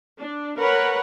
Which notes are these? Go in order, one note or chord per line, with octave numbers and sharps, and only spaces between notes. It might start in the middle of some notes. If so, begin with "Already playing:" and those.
D4
A#4 B4 C#5 F#5 B5